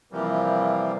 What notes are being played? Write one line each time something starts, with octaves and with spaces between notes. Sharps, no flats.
C3 E3 F3 G3 A#3